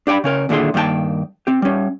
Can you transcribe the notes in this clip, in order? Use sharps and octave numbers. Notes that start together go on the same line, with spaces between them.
D4 G4 D5 G5 B5
C#3 C#4 A#4
D#2 A#2 D3 E4 G#4 C6
G2 D#3 A#3 E4 G5 A5
C4 G4
G3 C#4